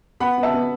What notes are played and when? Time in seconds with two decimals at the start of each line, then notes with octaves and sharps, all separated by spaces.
0.20 B3 F#5 B5
0.38 B3
0.43 E5 A5
0.53 B3